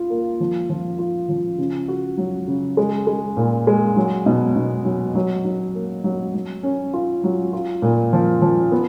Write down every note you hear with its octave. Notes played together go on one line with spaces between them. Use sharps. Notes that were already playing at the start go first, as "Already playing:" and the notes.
Already playing: F4
A#3
F3
F3
F4
F3
C#3
F#4
F#3
C#3
G#3
G#3
A#2
G#3
F#3
B2
B2
F#3
F#3
F#3
A#3
F#3
F#3
C#4
F4
F#3
F4
A#2
F3
F3
B3